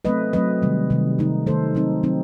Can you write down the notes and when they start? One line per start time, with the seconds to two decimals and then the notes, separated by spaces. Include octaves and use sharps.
0.05 F#3 A3 C4 B4 D#5
0.33 F#3 A3 C4 B4 D#5
0.62 C3 D#3 G3
0.90 C3 D#3 G3
1.19 D#3 A3 D#4
1.46 D#3 A3 D#4 A4 C5
1.75 F#3 C4 D#4
2.03 F#3 C4 D#4